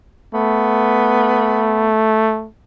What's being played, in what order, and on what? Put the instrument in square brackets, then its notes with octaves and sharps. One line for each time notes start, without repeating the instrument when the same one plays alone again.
[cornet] A3 [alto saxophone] B3